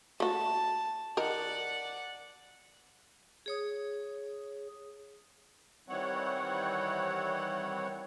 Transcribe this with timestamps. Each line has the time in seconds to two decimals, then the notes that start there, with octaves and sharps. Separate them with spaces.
0.20 A3 F#4 A5
1.17 D#3 A#4 D5 F#5
3.46 G#4 C#5 D#6
5.89 D#3 E3 G3 C4 C#5 F#5